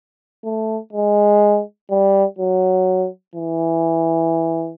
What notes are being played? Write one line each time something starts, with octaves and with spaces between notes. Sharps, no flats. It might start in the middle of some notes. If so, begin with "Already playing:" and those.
A3
G#3
G3
F#3
E3